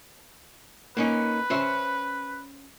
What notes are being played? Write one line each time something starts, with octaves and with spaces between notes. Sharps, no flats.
A#3 C#4 D#4 B4
C#4 C5 E5